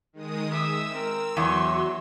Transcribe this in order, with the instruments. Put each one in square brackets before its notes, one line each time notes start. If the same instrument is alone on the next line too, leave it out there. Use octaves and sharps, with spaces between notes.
[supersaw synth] D#3 G#3 D#6
[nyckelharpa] E5 D#6 [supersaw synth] E6
[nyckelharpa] C4 A#4
[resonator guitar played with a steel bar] E2 [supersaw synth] F#3 [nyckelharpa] C#5 C6